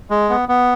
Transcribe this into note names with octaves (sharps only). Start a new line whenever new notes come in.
G#3
B3
B3